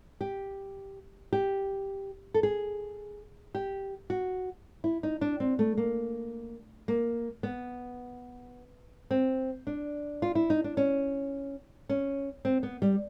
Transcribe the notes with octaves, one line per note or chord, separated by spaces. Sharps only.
G4
G4
A4
G#4
G4
F#4
E4
D#4
D4
C4
A3
A#3
A#3
B3
C4
D4
F4
E4
D#4
D4
C#4
C#4
C4
B3
G3